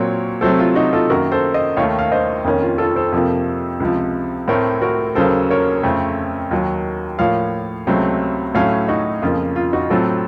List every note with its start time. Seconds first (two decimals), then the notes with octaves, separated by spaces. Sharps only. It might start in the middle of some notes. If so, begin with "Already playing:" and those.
Already playing: A#2 F#3 C4 A#4 C#5
0.41 C3 F#3 A3 A4 C5
0.59 F4
0.75 D#4 F#4
0.92 F4 A4
1.10 F#2 D#3 A#3 F#4 A#4
1.32 A4 C5
1.54 C5 D#5
1.77 D#2 D#3 A3 C#5 F5
1.99 F5
2.12 C5 D#5
2.44 F2 D#3 A#3 C#4
2.62 F4
2.78 F4 A4
2.96 A4 C5
3.12 F2 C3 F3 A#3
3.80 C#2 C3 F3
4.48 A2 A3 C4 A#4 C#5
4.82 F#4 A#4
5.15 D#2 C#3 F#3 A#3 A4 C5
5.50 A#4 C#5
5.83 F2 C#3 A3 C4
6.51 D#2 D#3 F#3
7.19 A2 F3 A#3 C#5 F5
7.87 C#2 C3 F#3 A3 C4
8.55 A2 F#3 A3 C#4 C#5 F5
8.88 D#4 F#4
9.22 F2 C#3 F3 A#3 F4
9.56 F4
9.73 D#4 F#4
9.90 A2 F#3 C4 F4 A4